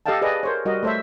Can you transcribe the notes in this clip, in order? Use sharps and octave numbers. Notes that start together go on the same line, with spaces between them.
G4 A4 D#5 F5 G5 A5
G#4 B4 D5 D#5
A#4 C5 C#5
G3 F#4 A#4 D#5
A3 A4 C5 C#5 E5